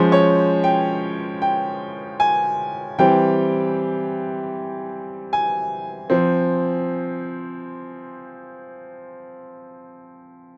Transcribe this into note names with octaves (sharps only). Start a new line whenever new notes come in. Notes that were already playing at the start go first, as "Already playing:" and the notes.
Already playing: F3 G#3 C#4 C5
C#5
G5
G5
G#5
E3 G3 C4 G5
G#5
F3 C4